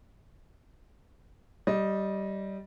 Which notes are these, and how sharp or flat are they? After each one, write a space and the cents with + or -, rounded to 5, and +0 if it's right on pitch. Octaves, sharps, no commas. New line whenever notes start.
G3 -15 D#5 +0